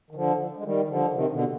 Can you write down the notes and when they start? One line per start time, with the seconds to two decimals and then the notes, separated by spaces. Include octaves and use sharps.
0.11 D#3
0.15 D3 F3
0.57 G#3
0.64 D#3 G3
0.89 D3 F3
1.13 C3 D#3
1.31 B2 D3